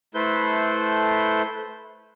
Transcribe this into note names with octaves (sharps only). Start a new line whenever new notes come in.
A3 E4 A4 B4 C5 G6